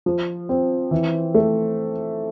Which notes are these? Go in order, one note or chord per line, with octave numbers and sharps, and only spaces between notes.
F3
C4
E3
A3